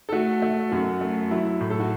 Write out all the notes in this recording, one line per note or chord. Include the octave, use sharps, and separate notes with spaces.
A4
A3 F#4
A3
F#2 F#4
A3
F#3 E4
A2
A4
F#4